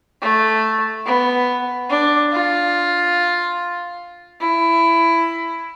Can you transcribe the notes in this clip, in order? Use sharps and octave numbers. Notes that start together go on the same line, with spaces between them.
A3
B3
D4
F4
E4